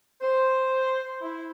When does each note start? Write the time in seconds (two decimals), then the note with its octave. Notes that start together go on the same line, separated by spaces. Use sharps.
0.22 C5
1.22 E4